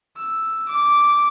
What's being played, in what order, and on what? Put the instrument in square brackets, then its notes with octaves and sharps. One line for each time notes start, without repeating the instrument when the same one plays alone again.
[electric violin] E6
D6